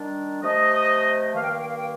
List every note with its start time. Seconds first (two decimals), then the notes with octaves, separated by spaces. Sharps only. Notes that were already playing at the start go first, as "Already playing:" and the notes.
Already playing: D#3 G3 D4
0.42 C3 F3 A3 D#5
1.34 G2 D#3 A#3 F5
1.42 G5
1.51 F5
1.59 G5
1.68 F5
1.77 G5